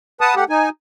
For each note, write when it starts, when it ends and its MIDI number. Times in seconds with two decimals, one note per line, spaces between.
0.21 0.35 71
0.21 0.35 78
0.21 0.35 81
0.21 0.35 87
0.36 0.44 57
0.36 0.44 67
0.36 0.44 78
0.49 0.69 63
0.49 0.69 80